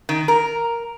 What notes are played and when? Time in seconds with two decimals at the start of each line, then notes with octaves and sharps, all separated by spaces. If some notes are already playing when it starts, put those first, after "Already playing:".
0.09 D#3
0.28 A#4